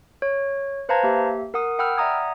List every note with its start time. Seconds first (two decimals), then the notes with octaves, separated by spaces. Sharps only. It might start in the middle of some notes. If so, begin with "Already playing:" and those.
0.22 C#5
0.89 B4 C5 F5 A5 A#5 G#6
1.03 A#3 G4 E5
1.54 A#4 F#5 D#6
1.79 F#5 G5 B5 E6 F6
1.97 D5 E5 F#5 A#5 D#6 G#6